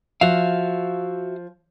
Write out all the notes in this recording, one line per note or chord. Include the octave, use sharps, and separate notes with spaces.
F3 F#4 E5 F5